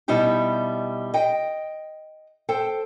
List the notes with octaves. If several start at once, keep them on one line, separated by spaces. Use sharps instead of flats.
B2 G3 D#4 E4 G4
D#5 G5
A4 C5 G5